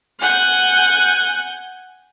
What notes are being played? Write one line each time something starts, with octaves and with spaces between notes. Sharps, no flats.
F#5 G#5 G6